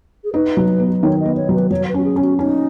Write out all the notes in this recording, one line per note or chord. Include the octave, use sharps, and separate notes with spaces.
G#4
D#4 B4
F#3
B3
D#3 C#5
D#5
B3
C#5
F#3
B4
F#3 C#5
B4
C#4 F#4
G#4
C#4
F#4
C#4 D#4